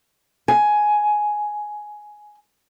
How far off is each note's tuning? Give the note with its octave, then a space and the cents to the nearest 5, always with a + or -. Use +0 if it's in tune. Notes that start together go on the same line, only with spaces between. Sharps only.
G#5 +10